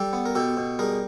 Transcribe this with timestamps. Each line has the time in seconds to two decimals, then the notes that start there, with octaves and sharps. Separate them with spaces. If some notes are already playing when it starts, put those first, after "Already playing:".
Already playing: G3 G4 A4
0.13 B3
0.26 A#4
0.35 B2 G4 A4
0.57 B2
0.79 G3 G#4 A#4